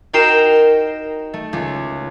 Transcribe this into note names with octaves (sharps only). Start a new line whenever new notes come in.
D#4 F#4 A#4 G5 C7 E7
A3
C#2